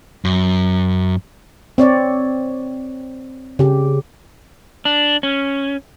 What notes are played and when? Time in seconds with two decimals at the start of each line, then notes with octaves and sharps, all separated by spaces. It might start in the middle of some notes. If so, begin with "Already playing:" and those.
0.25 F#2
1.78 C4 C#5 D5
3.59 C#3 G4
4.85 D4
5.23 C#4